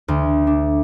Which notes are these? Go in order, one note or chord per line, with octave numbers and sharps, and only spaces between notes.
D2
D4